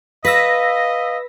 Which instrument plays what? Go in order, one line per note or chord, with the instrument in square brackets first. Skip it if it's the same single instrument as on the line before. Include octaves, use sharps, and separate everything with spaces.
[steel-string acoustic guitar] B4 [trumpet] D#5 [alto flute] F5 [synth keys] E6 A#6 B6